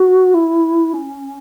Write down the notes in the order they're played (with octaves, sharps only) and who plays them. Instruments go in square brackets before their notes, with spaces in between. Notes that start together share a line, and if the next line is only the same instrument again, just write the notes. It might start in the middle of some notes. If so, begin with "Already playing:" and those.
Already playing: [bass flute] F#4
E4
C#4